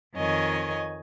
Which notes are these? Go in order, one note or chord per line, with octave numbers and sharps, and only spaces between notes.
F2 D#3 C#5 D#5 G#5